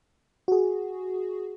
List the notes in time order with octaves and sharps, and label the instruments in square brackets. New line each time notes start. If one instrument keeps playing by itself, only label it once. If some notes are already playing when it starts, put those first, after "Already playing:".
[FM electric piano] F#4 G#4